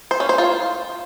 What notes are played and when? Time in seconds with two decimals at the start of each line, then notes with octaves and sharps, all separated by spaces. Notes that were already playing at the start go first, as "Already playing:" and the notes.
0.11 C5
0.20 C#4
0.29 C5
0.38 F4